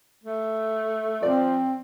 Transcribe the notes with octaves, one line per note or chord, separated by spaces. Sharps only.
A3
F3 C4 D5